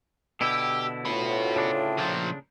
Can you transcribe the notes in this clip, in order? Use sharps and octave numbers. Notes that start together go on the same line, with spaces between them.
B2 D3 E4 G4 E6
D2 A2 F4 F#4 B4
C#3 D4
A#2 F3